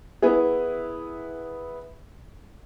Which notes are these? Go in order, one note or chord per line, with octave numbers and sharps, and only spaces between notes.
B3 E4 G#4